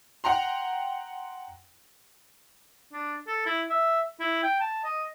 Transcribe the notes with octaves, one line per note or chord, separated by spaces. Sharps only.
F#5 G5 A#5 C6
D4
A4
E4
E5
E4
G5
A5
D#5